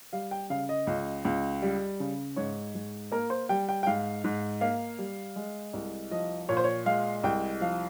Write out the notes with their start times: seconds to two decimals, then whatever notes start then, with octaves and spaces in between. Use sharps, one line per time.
0.13 G3 F5
0.31 G5
0.50 C#3 F5
0.69 D#5
0.87 C#2
1.25 C#2
1.62 G3
2.00 C#3
2.36 G#2 C#5
2.75 G#2
3.12 A#3 A#4
3.30 C5
3.49 G3 G5
3.69 G5
3.83 G5
3.87 G#2 F5
4.24 G#2
4.61 A#3 F5
4.99 G3
5.36 G#3
5.73 C2
6.11 F3 D#5
6.49 A#2 C#5
6.57 C5
6.64 C#5
6.86 G#3 F5
7.23 C2 G5
7.61 F3 F5